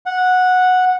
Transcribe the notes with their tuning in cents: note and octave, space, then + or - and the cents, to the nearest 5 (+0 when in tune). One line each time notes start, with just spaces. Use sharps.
F#5 -10